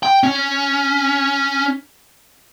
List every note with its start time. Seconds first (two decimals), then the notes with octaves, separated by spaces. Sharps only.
0.03 G5
0.23 C#4